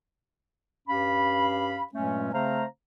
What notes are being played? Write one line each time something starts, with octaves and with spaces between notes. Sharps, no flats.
G2 C#4 G4 F5 B5
G2 A#2 F#3 G#3 A3 C#4
C#3 A3 C4 C5 F5 A#5